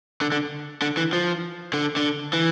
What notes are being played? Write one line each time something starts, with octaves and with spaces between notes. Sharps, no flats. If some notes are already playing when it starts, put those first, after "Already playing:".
D3
D3
D3
E3
F3
D3
D3
E3